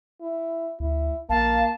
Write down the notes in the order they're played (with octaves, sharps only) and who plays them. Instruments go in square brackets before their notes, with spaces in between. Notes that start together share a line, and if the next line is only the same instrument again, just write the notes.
[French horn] E4
[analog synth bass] D2 [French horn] E4
[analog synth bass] A#1 [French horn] A#3 [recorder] F5 [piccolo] A5